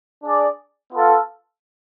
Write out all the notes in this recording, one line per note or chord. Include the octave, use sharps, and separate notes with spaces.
D4 G#4 D5
B3 F4 A4 F5